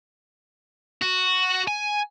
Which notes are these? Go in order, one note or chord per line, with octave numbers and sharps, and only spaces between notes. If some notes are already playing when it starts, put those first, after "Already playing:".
F#4
G#5